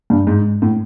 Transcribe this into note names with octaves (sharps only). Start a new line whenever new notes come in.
G2
G#2
A2